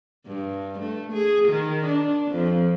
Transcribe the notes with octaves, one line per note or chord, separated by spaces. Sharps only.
G2
A3
G#4
D#3
D4
F2